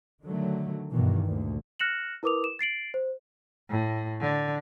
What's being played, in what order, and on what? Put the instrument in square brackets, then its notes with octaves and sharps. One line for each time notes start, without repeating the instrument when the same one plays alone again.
[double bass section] D3 D#3 F#3 A3
G2 B2 D#3 E3
D2 A#2
[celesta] F6 F#6 A#6 C#7 E7 F#7
E4 A#4 B4 D6 D#6 F7
E7
A6 C7 D7 F#7
C5
[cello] A2
D3